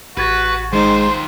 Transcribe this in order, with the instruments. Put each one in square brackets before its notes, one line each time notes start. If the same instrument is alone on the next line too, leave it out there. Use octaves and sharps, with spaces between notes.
[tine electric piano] A1 G#6 A6 [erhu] F#4 [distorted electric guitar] B4
[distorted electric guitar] D#3 F4 [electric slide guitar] G#3 D#4 [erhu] C5